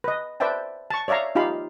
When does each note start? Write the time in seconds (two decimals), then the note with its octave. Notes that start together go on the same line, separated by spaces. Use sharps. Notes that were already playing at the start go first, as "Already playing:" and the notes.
0.04 B4 D#5
0.40 B4 C5 D5 E5 G5 A5
0.90 A5 C#6
1.08 C#5 D5 E5 F5 A#5
1.35 D#4 F4 G4 F5 B5